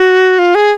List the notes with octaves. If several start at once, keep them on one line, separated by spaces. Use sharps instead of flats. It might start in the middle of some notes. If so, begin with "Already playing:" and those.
Already playing: F#4
F4
G#4